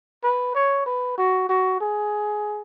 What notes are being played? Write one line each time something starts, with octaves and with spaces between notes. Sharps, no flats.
B4
C#5
B4
F#4
F#4
G#4